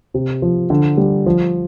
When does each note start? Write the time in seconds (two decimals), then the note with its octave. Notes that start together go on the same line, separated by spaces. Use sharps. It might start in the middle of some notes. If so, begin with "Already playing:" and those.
0.14 C3
0.42 F3
0.70 D3
0.97 G3
1.26 F3